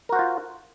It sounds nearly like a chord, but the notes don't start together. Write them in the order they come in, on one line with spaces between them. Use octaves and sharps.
A#4 F#4 C5 F4